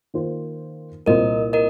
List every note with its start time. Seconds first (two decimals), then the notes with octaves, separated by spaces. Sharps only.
0.14 D#3 A#3 F4 C5
1.06 C2 A#2 A#3 F4 A#4 C5 D#5
1.53 A#4 D#5